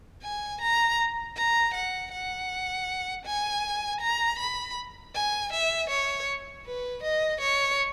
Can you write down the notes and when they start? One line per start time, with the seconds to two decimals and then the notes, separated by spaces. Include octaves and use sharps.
0.23 G#5
0.61 A#5
1.37 A#5
1.74 F#5
2.12 F#5
3.25 G#5
4.01 A#5
4.39 B5
5.14 G#5
5.52 E5
5.90 C#5
6.66 B4
7.03 D#5
7.41 C#5